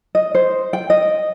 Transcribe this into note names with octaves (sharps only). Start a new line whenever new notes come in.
D#5
C5
G5
D#5